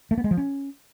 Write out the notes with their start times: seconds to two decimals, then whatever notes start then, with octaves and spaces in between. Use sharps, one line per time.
0.11 A3
0.18 B3
0.24 G#3
0.31 F3
0.37 C#4